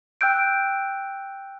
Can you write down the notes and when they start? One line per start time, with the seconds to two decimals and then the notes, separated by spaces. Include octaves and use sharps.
0.21 G5 E6 F#6 G6 D7